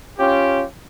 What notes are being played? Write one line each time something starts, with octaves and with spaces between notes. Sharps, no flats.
C#4 F4 G4